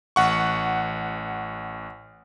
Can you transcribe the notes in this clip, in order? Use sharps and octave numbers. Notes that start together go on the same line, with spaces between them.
A1 F#5 C#6